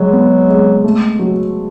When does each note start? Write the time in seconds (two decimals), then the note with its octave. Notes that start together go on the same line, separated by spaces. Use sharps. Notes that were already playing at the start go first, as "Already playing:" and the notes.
Already playing: F#3 G#3
0.12 B3
0.48 G#3
0.84 A3
1.19 F#3